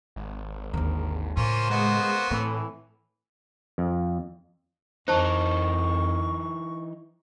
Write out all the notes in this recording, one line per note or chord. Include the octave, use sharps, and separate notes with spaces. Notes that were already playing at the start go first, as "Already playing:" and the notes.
G#1
D#2 D3 A#4
A2 C#3 A#3 C#4 F4 C5
G#3 A#3 B3 F#4
A2 E3 C4
F2
F2 E3 D#4 C5 A5 C#6